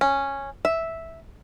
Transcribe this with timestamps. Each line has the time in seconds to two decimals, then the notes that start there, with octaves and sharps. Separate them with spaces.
0.01 C#4
0.65 E5